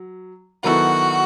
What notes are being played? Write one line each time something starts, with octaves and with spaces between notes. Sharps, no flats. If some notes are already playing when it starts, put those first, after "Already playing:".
Already playing: F#3
D#3 F#3 B3 E4 F#4 A4